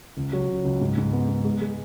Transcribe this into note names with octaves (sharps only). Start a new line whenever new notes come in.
C#2
F#3
C#2
C#2
G#2
G#2
B3
B3
G#3
G#3